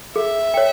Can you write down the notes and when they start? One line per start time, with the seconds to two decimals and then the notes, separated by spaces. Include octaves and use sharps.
0.15 G#4 E5
0.54 C#5 G5